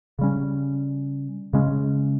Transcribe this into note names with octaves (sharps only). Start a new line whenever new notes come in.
C#3 G3 C#4
C#3 G#3 C#4